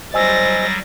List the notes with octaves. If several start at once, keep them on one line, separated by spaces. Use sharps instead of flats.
F#3 G3 C5 D#5 G#5 E6 A6 A#6